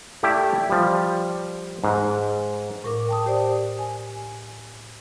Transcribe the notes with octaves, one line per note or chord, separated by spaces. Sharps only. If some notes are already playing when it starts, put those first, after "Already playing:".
A3 E4 G4 D5 E5 G5
F3 G3
G#2
A2 A#4 D6
G5 A5 D#6
G4 C5 D5
G#5